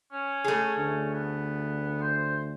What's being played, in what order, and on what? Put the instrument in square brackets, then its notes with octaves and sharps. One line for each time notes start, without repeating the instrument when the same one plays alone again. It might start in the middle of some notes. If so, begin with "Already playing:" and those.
[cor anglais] C#4
[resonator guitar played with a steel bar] A3 G#4
[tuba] D2 [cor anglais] C#4
[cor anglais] B3
C5